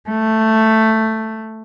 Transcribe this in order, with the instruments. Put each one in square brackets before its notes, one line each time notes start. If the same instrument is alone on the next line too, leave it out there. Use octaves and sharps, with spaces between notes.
[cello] A3